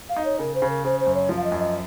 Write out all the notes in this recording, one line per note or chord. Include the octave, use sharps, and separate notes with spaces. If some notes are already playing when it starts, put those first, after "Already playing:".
F5
D#4
C#5
C#3 A#4
C5
C#3
A#4
C#3 C5
C5
F#2
C#5
F3
F5
D#5
F#2
D#5